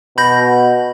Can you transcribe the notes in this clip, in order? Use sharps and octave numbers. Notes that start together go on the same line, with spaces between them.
B2 B5 G6 A#6